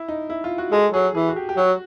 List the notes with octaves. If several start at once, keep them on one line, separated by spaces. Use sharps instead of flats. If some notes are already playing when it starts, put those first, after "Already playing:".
Already playing: E4
D#4
E4
F4
F#4
G#3 A4
F#3 G#4
E3 G#4
F#4
G4
G4
F#3 F#4